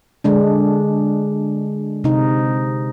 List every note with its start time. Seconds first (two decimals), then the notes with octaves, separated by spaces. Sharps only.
0.24 D3 G#3 D4
2.04 C3 D#4